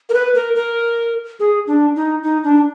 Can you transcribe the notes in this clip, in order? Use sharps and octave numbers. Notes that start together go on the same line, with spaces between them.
A#4
B4
A#4
A#4
G#4
D4
D#4
D#4
D4